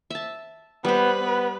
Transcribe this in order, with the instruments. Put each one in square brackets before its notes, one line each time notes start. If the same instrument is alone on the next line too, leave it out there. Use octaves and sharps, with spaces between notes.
[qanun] E5 A5
[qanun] G3 C5 [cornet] B3 [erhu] B4
[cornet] B3